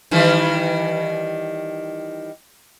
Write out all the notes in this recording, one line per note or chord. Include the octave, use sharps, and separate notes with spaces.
D#3 E3 G3